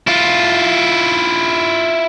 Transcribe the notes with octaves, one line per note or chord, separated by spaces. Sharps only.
E4 F4